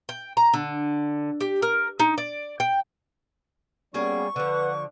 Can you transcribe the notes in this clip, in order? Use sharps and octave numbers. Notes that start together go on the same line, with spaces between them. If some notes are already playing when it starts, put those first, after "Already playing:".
G5
A#5
D3
G4
A#4
D#4
D5
G5
G3 A#3 B3 C#4 F#4 G#4 C#6
D3 F3 B4 F#5